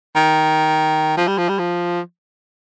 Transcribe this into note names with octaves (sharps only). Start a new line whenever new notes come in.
D#3
F3
G3
F3
G3
F3